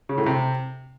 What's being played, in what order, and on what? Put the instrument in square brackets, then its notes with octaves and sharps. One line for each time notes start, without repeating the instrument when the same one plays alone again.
[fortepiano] C#3
A2
C3